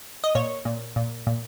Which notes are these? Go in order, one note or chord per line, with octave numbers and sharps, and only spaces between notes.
D#5
A#2 C#5
A#2
A#2
A#2